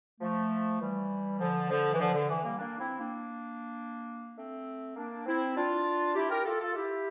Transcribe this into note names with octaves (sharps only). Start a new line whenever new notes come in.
F3 A3
E3 G3
D3 F3
D3 F3
E3
D3 F3
D3
E3
G3 A#3
A#3 D4
C4 E4
A#3 D4
A3 C4
A#3 D4
C4 E4
D4 F4
E4 G4
G4 A#4
F4 A4
F4 A4
E4 G4